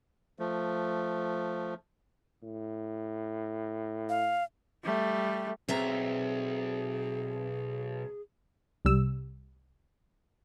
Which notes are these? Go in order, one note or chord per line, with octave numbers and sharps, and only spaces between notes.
F3 A3
A2
F5
G3 A3
B1 C4 G#4 E5 A#5
C2 G3 E6